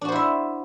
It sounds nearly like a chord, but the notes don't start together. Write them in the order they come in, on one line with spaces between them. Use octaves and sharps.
D4 F#4 C5 E4 E5